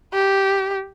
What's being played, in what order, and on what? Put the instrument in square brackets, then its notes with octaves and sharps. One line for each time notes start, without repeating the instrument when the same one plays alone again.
[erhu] G4